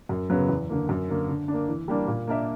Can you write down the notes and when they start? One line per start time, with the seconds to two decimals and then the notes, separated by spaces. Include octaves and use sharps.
0.09 F#2
0.30 C#3 F#3 B3
0.49 E2
0.70 D3 A#3
0.89 F#2
1.09 D3 A#3
1.29 D3
1.48 D4
1.53 A#3
1.68 E3
1.88 G3 A#3 D4
2.08 A#2
2.27 A#3 D4 A#4 E5